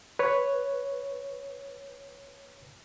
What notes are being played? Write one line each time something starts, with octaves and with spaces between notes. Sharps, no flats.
B4 C#5